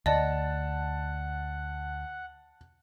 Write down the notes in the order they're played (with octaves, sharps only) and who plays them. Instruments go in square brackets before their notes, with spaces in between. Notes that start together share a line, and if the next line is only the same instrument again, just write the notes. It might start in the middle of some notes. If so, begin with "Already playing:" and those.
[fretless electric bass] D2 [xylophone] D5 D#5 [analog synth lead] F#5 [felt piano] A5